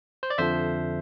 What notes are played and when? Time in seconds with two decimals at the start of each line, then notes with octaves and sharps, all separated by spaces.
0.23 C5
0.30 D5
0.38 F2 D3 F3 C5 E5